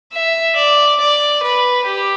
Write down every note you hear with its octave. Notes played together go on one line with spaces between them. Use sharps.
E5
D5
D5
B4
G4